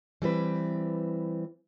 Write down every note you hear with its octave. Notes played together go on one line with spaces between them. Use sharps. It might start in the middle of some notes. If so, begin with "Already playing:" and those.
E3 G3 C4 B4